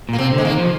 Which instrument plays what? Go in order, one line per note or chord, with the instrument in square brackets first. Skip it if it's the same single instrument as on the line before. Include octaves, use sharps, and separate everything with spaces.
[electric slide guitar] A#2 [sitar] A#3
[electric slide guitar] C3 [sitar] C4
[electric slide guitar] D3
[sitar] G#3
[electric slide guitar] D#3 [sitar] A#3
[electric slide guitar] F3